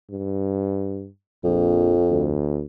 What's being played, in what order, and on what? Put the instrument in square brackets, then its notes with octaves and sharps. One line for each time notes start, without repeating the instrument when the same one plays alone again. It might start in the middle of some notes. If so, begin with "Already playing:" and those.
[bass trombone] G2
[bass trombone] A#1 [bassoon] F2
[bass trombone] D2